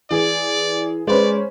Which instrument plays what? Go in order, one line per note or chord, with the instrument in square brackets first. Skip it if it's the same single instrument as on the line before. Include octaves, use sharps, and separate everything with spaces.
[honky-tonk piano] E3 G#4 [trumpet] D5
[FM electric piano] G#3 B4 [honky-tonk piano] C#4 C5 [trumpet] D5